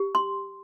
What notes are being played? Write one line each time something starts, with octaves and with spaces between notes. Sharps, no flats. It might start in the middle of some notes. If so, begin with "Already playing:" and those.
Already playing: G4
C6